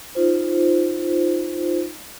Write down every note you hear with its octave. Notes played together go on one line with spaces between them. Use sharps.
D#4 F4 C5